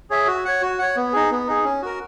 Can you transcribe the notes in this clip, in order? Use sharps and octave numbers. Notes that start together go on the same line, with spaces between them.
G#4 C#5 E5
F#4
C#5 F#5
F#4
C#5 F#5
B3
D#4 G#4
B3
D#4 G#4
C#4
F#4 A#4